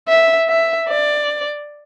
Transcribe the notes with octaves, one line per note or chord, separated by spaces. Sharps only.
E5
E5
D5